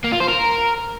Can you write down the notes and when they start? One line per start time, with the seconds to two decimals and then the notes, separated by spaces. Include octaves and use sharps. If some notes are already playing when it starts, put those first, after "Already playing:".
0.04 A#3
0.12 F4
0.20 C5
0.29 A#4